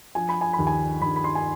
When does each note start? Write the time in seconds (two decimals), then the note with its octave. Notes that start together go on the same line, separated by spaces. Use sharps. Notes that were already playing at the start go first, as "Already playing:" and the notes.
0.15 F3 G#5
0.29 B5
0.41 G#5
0.53 B5
0.59 D#2
0.67 G#5
1.02 D#2 B5
1.16 B5
1.24 C6
1.35 G#5